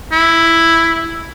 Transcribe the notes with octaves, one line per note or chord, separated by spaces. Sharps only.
E4